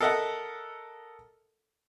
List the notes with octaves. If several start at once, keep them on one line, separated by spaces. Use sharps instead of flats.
A4 A#4 D#5 E5 F#5